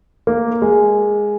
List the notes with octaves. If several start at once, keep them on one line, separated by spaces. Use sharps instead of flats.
A#3
G#3